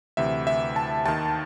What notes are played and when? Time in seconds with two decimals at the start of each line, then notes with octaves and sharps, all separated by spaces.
0.17 D2 C3 E3 E5
0.47 E5
0.76 A5
1.06 D#2 D#3 A5